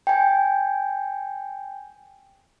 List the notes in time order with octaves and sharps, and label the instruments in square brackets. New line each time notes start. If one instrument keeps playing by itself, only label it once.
[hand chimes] G5 G#5